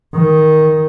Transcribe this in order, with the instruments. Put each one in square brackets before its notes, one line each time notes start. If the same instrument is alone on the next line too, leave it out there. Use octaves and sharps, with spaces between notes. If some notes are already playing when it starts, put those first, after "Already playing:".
[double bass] D#3